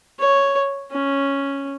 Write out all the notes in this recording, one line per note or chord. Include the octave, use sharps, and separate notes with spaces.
C#5
C#4